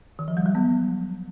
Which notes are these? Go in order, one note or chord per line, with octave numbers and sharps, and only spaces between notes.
D#3
F3
G3
F#3
B3